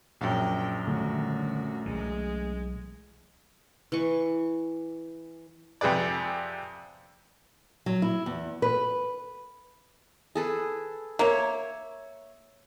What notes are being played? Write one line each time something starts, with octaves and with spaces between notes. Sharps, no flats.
A#1 F#2 G5
D3 D#3 G3 A3 C#4 F#4
B1 E3 G#3
E3 C#6
F2 C3 G#4 B4 D5
F#3
E4
E2
B4
G#4 A4 B4
A#3 C#5 E5